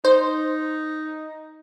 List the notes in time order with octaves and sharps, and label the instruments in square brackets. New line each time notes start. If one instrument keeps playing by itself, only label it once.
[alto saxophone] D#4 [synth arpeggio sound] C5